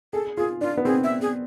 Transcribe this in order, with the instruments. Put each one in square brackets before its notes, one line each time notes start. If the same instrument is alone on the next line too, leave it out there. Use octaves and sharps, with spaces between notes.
[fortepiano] G#4 [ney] A4
[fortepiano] F4 [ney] G#4
[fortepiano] D4 [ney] F4
[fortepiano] B3
[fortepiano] C4 [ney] G#4
[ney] E5
G#4